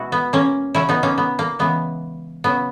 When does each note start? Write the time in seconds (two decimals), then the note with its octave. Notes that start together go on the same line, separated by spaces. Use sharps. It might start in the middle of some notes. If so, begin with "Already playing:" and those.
Already playing: B2 G#3 E4 F#4
0.12 B3
0.33 A#3 C#4
0.75 C#3 F#3 C#4 E4
0.89 B3 D#4
1.03 A#3 C#4
1.18 B3
1.39 A#3
1.59 C#3 E3 G#3 B3
2.44 C#3 F#3 B3